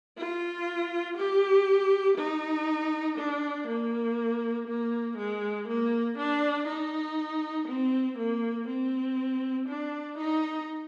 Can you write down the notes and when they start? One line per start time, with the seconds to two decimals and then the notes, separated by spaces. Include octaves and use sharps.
0.17 F4
1.17 G4
2.18 D#4
3.18 D4
3.68 A#3
4.68 A#3
5.18 G#3
5.68 A#3
6.18 D4
6.68 D#4
7.68 C4
8.18 A#3
8.68 C4
9.68 D4
10.18 D#4